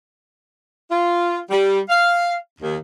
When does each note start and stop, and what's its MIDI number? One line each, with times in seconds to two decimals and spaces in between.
0.90 1.37 65
1.50 1.79 55
1.89 2.34 77
2.61 2.75 39